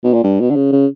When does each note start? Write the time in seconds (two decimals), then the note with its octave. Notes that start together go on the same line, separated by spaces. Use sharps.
0.04 B2
0.14 A#2
0.23 G2
0.40 B2
0.50 D3
0.56 C#3
0.72 C#3